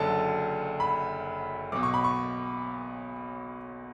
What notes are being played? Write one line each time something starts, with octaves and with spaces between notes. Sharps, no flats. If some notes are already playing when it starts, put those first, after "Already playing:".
Already playing: F#1 F#2 D3 A5
B5
B1 B2 D6
C#6
B5
C#6